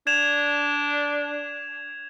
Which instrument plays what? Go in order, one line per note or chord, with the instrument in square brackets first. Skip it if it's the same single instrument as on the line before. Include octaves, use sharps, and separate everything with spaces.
[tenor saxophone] D4 [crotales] G#6 E7 F7